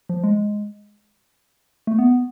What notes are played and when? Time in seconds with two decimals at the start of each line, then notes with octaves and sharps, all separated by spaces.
0.09 F3
0.24 G#3
1.87 A3
1.99 B3